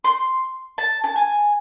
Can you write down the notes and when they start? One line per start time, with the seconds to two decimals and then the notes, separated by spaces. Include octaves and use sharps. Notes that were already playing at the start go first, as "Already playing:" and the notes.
0.04 C6
0.78 A5
1.04 A5
1.16 G#5